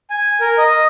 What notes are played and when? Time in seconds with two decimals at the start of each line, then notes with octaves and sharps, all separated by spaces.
0.10 G#5
0.40 A#4
0.58 D#5